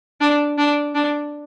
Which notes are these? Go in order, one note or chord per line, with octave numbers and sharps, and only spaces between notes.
D4
D4
D4